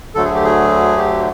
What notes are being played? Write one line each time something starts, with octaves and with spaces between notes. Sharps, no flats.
D2 D3 F#3 A3 A4
G#4
G4
G#4
G4